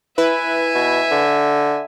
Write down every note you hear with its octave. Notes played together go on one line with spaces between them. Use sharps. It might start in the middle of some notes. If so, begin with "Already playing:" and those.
E4 B4 E5 G#5
B2
D3